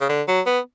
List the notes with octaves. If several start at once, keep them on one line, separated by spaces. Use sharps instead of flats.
C#3
D3
F#3
B3